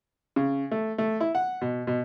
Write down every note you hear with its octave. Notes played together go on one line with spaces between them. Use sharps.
C#3
A3
A3
E4
F#5
B2
B2